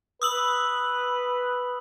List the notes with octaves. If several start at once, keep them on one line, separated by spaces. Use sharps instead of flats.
B4 D#6 E6 F#7